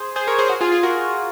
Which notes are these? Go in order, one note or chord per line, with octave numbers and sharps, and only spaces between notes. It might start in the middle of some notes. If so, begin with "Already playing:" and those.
Already playing: G#4 C5
G#4 C5
A#4 C#5
G#4 C5
F#4 A#4
F4 G#4
F4 G#4
F#4 A#4